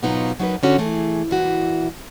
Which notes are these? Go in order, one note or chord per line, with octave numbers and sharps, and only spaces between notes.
G#2 B2 F#3 B3 D#4 F4
F#3 C#4 D#4 G4 A#4 B4
D3 C#4 F#4
E3 A3 G#4
A#2 E3 F#4